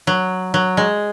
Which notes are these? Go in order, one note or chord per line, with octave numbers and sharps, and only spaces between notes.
F#3
F#3
G#3